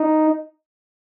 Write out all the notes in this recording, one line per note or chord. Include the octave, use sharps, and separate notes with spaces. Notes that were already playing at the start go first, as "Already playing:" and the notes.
Already playing: D#4